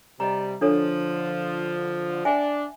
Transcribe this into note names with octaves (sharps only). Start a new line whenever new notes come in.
C3 G3 D#5 A#5
D3 F3 D4 A4 C#5
D4 E5 G5 G#5